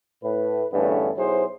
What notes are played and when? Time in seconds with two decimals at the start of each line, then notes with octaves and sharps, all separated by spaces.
0.23 A2 B4
0.73 E2 G2 D3 A3 B3 C#4
1.17 B1 F#3 E4 G#4 C5